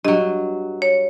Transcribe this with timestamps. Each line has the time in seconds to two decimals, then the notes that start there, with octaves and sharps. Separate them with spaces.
0.05 G2 F#3 D#5
0.82 C#5